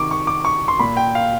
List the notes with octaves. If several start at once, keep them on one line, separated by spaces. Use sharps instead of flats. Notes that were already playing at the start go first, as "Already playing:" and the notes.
Already playing: C3 D#3 C#6 D6
C#6
D6
C#6
C6
A#2 B5
G5
F5